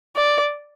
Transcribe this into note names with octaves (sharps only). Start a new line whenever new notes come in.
D5